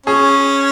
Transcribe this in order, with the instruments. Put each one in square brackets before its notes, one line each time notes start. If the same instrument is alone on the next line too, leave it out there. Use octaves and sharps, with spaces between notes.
[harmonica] C#4 [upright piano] G#4